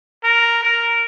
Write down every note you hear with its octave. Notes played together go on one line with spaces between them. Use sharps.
A#4
A#4